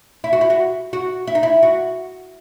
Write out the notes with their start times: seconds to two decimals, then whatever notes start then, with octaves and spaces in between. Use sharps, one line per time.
0.24 E4
0.33 F#4
0.41 E4
0.50 F#4
0.93 F#4
1.27 E4
1.35 D#4
1.43 E4
1.63 F#4